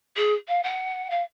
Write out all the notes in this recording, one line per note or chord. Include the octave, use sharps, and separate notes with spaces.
G#4
F5
F#5
F5